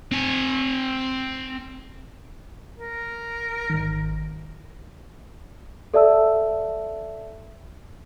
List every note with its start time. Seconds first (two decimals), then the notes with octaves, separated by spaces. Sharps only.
0.11 C4 G#5
2.79 A#4
3.70 G#1 D#3
5.94 A4 D5 E5 A5 E6